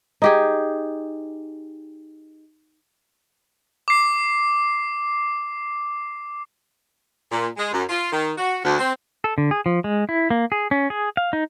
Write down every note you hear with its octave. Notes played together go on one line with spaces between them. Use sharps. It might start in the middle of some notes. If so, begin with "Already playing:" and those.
D#4 G4 G#4
D6 C7
A#2
G#3
F#2
F4
D#3
F#4
D2
C4
A4
D3
G#4
F3
G#3
E4
A#3
G#4
C#4
G#4
F5
D#4